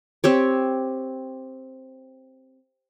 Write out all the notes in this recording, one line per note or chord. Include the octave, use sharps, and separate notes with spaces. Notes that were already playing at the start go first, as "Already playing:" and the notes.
C4 G4 C#5